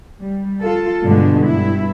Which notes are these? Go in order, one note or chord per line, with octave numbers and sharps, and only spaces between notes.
G3
F4 A4
G2 B2 D3 G#3 D4
G2 E4